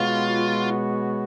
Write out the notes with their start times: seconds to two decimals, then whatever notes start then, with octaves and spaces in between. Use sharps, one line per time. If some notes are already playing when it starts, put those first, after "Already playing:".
Already playing: B2 G#3 B3 F4 F#4 C#5